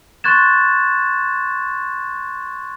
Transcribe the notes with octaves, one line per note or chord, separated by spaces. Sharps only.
C6 C#6 F#6 G#6 A6 E7